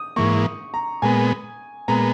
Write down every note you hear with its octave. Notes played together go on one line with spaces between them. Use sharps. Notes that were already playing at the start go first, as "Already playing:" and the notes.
Already playing: D#6
G#2 E3 A#3 C#6
A#5
A#2 G#3 B3 G#5
A#2 G#3 B3 A#5